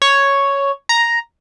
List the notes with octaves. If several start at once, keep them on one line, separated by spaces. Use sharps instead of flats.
C#5
A#5